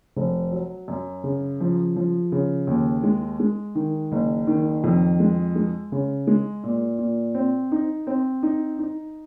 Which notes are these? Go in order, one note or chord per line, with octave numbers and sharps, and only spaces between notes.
F1
F#3
F#2
C#3
F3
F3
C#3
D#2
G#3
G#3
D#3
F#1
D#3
F2
G#3
G#3
C#3
G#3
A#2
A#2
C4
D#4
C4
D#4
D#4